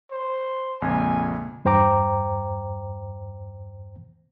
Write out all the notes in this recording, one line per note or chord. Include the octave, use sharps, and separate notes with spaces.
C5
A#1 F2 C#3 G#3 A#3 G#5
E2 G2 C5 G5 A#5 D6